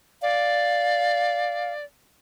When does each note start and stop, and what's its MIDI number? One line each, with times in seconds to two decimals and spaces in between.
0.22 1.84 74
0.22 1.73 77